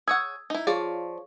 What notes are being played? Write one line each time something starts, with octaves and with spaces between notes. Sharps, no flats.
G#4 C#5 F#5 D#6 E6 G#6
D#4 E4
F3 F4 G#4 C#5 D5